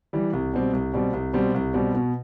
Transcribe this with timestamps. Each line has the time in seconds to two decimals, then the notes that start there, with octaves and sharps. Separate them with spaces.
0.13 E3 G3
0.33 C2
0.54 B2 G3 C4
0.73 C2
0.93 B2 G3 C4
1.13 C2
1.33 B2 G3 C4
1.54 C2
1.74 B2 G3 C4
1.94 B2